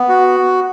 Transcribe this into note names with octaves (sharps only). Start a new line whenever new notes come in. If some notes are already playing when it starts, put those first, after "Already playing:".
Already playing: B3
F#4